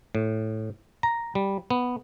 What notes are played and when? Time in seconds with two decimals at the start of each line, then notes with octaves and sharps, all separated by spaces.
0.15 A2
1.03 A#5
1.35 G3
1.70 B3